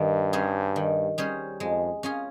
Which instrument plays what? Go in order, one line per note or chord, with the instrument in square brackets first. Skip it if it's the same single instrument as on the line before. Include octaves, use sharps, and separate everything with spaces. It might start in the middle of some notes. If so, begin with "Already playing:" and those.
Already playing: [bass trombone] G2 [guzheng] D#3
[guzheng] G3 C#4 G#4 C5
D#3
G3 C#4 G#4 C5
[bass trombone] F2 [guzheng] G#3
[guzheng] C#4 F4 G#4